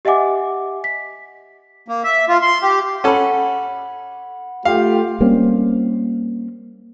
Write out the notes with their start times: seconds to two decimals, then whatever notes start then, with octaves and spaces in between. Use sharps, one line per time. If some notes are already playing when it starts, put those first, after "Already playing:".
0.05 G4 D#5 E5 F#5 G#5 D6
0.84 B6
1.88 A#3
2.04 E5
2.29 F4
2.42 C6
2.62 G4
3.04 C#4 A4 F#5 B5
4.65 A3 F4 G4 F5
5.20 G3 A#3 C4 C#4